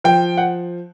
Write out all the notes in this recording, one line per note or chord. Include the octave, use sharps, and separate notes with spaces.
F3 G5
F#5